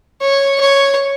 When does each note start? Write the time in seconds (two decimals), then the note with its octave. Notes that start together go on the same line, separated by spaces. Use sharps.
0.21 C#5
0.60 C#5